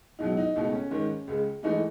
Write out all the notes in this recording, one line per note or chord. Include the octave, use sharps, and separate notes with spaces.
C#2 B2 F#3 D#4
D#4
C#2 B2 A3 D#4
C#4
G#2 D#3 G#3
C#2 C#3 G#3
G#2 E3 A3 D#4